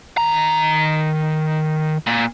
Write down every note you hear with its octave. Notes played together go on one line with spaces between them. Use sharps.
D#3 A#5
A#2